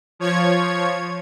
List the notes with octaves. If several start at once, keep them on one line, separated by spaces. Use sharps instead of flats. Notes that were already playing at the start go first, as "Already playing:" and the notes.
F3 C#5 G#6